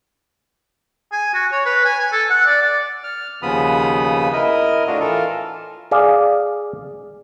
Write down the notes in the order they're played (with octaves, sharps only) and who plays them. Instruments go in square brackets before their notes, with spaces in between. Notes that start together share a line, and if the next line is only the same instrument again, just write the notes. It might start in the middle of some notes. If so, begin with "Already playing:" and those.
[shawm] G#5
F#4
C#5
B4
G#5
G#5
A4
F#5
D5
D5
[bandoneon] F6
D#2 C#3 F3 B3 B5 D#6
E4 A#4 D#5
A2 D4 F4 F#4
E3 F4 A4 A#4
[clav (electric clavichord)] G#4 D5 F5